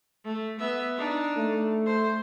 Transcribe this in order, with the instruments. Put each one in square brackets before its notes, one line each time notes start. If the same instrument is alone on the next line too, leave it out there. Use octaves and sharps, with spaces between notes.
[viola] A3
B3 E5
D4 D#4
[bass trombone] A3
[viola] C5